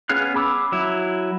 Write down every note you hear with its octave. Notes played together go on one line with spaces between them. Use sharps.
B3 C#4 G#4 F5 F#6
B5 D6 E6
F#3 E4